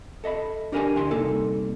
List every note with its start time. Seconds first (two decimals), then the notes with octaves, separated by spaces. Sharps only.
0.24 A4 D#5 E5 B5
0.72 D4 G4 A#4 E5 G5 G#5
0.96 D2 E4 G4 G5 G#5 C6
1.11 C2 A#3 D#4 A4